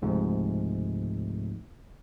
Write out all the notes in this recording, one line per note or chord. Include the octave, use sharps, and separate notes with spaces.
C#2 G#2 C3 F3 A3